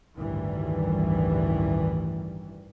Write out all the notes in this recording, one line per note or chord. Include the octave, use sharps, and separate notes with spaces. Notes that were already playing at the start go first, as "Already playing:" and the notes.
A1 D2 G2 D#3 E3 G3